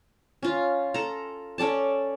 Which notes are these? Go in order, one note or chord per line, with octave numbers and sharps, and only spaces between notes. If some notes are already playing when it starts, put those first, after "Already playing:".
C#4 F4
A4 A#5
C#4 A4 D5 A5